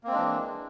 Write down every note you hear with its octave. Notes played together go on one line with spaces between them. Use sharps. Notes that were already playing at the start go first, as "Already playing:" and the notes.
E3 G#3 A#3 C4 D4